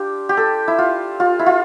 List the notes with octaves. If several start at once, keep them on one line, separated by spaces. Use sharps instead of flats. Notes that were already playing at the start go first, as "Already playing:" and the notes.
Already playing: D4 F4 G4
G4
A4
E4
F4
F4
E4
F4